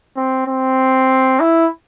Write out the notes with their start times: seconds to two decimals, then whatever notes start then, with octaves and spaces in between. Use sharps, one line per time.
0.17 C4
0.47 C4
1.40 E4